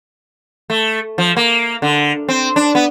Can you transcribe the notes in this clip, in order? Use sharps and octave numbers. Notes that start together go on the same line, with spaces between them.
A3
F3
A#3
D3
C4
D4
B3